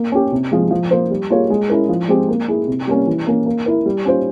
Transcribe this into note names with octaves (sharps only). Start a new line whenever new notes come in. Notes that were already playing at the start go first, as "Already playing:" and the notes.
Already playing: A#3
C#4 G4
C3
F3 G#3
F3
A#3 F4 C5
G3
A#3 F4 G#4 C#5
G#3
C#4 E4 A#4
F3
G#3 C4 G4
A#3
E4 G#4
C3
G3 A#3 C#4
E3
A#3 C#4
A#3
E4 A#4
G3
C#4 F4 C5